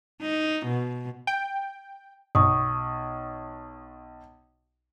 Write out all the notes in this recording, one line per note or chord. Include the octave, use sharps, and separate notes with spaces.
D#4
B2
G5
B1 C#6 D#6